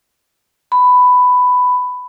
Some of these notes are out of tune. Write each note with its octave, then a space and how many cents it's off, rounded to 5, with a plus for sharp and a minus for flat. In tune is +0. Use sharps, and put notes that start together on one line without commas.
B5 +10